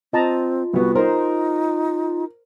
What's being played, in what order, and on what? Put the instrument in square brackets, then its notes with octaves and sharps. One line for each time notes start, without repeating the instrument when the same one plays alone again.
[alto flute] C4 [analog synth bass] F4 [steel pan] D#5 A5 A#5
[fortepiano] C2 B3 [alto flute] F#4
[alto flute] D#4 [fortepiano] A#4 [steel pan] C5